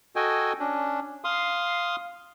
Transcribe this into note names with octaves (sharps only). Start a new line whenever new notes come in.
F#4 A4 D#5 G5 G#5
C#4 D4
F5 C6 D#6